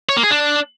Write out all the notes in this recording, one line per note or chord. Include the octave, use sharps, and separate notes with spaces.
C#5
A#3
G#4
D4